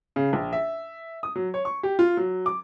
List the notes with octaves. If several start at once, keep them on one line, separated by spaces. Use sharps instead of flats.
C#3
A#1
E5
D#6
F#3
C#5
C#6
G4
F4
F#3
D6